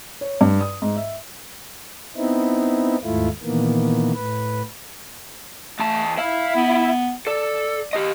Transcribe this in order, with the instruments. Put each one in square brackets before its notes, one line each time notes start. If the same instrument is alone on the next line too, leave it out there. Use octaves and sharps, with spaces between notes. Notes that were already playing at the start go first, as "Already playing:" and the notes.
[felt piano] C#5
G2
D#6
G#2
E5
[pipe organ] B3 C4 D#4 E4
D#2 G#2 A3 E4 F4
A#2 D#3 E3 A#3 B3
A2 B4
[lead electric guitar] E2 A5 [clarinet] A3
[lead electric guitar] E4 E5 [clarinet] F5
[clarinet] B3
[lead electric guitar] A4 [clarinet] D5
[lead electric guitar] G4 D#5